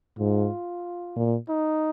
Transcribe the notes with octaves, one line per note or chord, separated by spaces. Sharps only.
G#2 F4
A#2
D#4